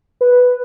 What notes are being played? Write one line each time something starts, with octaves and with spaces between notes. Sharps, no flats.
B4